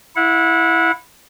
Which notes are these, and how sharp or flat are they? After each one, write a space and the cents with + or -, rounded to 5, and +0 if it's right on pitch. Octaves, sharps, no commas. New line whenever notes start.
E4 +0 F#5 -30